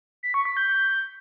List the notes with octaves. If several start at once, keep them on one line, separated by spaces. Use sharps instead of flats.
B6
C#6
B6
G6
G6